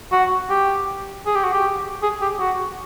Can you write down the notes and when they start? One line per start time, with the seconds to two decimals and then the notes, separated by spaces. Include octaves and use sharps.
0.12 F#4
0.50 G4
1.26 G#4
1.35 G4
1.44 F#4
1.53 G4
2.03 G#4
2.21 G4
2.40 F#4